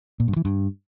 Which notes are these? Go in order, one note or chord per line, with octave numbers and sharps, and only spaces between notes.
A#2
G2
E3
G2